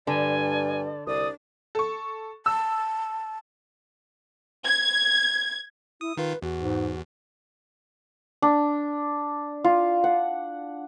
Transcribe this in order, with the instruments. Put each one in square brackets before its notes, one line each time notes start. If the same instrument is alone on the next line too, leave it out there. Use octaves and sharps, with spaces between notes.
[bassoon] G2 [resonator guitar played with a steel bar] D3 [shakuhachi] D5 [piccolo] G#5
[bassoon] C2 [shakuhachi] D5 [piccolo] D#6
[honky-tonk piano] A4 C#6
[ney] A5 [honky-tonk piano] E6
[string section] G#6
[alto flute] E4 [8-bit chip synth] D#6
[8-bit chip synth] D#3 F4 [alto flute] B4
[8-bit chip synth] E2 [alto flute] F#4
[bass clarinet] G#2
[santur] D4
F4
F#5